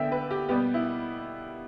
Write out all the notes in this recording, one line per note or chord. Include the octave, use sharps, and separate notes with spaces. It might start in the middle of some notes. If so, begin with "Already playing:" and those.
Already playing: D3 B3 E5 G5
B4
G4
B2 G3 B3 G4
E4